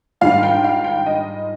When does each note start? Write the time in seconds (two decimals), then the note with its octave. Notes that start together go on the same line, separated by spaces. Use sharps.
0.21 G#2 D#3 G3 D4 F4 F5
0.43 G5
0.64 F5
0.84 G5
1.06 D#5